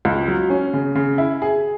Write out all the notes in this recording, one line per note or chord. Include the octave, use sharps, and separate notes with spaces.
C#2
F#3
C#4
C#3
C#3
E4
G#4